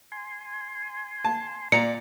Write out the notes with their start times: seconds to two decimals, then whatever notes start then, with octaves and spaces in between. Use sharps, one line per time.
0.12 G#5 C6
1.25 A5
1.72 A#2 D5 A#5 C#7